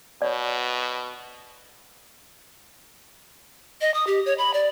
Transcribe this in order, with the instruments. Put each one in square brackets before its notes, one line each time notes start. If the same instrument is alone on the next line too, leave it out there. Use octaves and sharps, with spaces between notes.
[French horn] B2 [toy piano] C#5 D5
[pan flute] D#5
D#6
G4
C#5
B5
D5